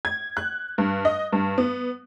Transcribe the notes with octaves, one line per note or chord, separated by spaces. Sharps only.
G#6
F#6
G2
D#5
G2
B3